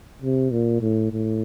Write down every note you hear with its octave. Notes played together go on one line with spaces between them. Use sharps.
C3
A#2
A2
A2